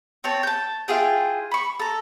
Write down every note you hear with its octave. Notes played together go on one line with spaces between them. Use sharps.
C4 C#5 A5
A5 G6
E4 F4 G#4 G5
B5 C#6
A4 A#5